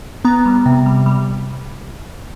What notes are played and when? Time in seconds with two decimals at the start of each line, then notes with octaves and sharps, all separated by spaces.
0.25 B3 A#5
0.46 G3
0.66 C3
0.86 G3
1.06 G3